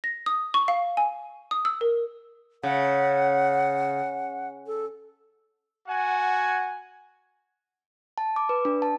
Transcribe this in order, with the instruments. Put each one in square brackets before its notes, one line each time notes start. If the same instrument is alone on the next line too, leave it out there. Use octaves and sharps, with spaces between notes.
[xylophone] A#6
D#6
C#6
F5
G#5
D#6
E6
A#4
[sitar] C#3 [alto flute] F#5
[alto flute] A4
[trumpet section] F#4 F#5 G#5
[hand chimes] A5
D6
B4
D4
A5